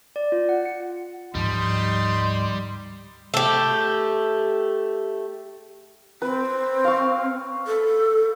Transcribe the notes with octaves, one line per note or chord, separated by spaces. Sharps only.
D5
F4
F#5
C#7
D2 G#2 F3 G3 D#4 C6
A3 G4
C4 B4
F5 C#6
A4